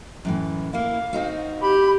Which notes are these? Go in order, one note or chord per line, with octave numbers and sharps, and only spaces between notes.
F#2 A2 E3
A#3 E4 F5
C4 D#4 F#4
G4 B5